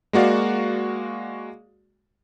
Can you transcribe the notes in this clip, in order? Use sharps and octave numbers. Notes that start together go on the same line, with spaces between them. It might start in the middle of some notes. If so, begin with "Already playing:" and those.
G#3 A#3 F#4 D5 F5